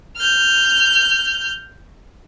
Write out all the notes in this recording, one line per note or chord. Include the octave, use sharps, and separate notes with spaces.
F6 G6